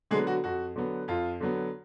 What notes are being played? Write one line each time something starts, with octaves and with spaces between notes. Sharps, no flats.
D3 F#3 G#3 B3 G#4
F#4
F2 F#4
D3 F#3 B3
F2 F4
D3 F#3 B3